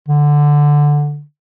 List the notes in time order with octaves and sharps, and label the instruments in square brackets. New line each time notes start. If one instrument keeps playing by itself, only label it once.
[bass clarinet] D3